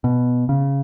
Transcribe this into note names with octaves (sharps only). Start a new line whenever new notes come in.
B2
C#3